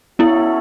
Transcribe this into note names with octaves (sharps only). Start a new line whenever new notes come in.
B3 C#4 E4 F#4 A4 C#5 E5